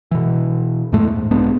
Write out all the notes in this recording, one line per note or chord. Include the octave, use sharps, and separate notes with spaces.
B2 E3
E2 A2 G#3 A3
G#2
C2 G#3 B3 D4